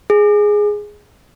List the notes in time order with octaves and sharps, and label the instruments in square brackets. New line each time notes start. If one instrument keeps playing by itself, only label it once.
[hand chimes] G#4